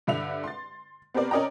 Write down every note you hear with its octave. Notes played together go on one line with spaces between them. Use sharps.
G2 D3 E5 F7
C6 A6
B3 C4 G4 A#4 D5
C#4 A#4 D5 D#5 G5 A#5